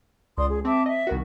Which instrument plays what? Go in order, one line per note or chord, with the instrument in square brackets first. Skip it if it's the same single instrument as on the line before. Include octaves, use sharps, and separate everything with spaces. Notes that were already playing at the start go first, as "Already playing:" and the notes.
[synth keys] C#2 [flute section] D5 C6 D#6
[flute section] G#4
[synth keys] C4 [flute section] E5 A5 D6
[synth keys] D#5 [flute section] E5
[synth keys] C2 D#3 F#4